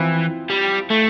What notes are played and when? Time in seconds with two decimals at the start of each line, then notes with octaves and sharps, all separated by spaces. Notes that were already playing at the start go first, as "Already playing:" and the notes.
Already playing: E3 F3 C4 E4
0.50 G3
0.90 A3